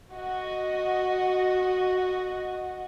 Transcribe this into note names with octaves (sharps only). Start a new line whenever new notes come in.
F#4 D#5